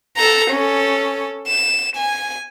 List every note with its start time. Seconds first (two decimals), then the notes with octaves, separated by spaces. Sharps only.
0.17 A4 A#5
0.51 C#4 A4
1.48 E7
1.96 G#5